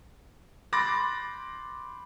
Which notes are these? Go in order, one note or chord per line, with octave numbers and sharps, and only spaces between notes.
B5 C6 D6 A6 A#6